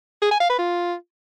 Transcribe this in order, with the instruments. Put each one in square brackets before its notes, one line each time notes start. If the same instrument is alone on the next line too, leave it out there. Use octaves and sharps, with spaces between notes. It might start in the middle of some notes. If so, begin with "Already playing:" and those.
[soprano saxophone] G#4
G#5
F5
B4
F4